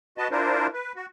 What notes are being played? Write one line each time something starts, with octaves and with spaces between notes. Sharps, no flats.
F#4 B4 D#5 A5
D4 E4 F4 A#4 C5
B4
F#4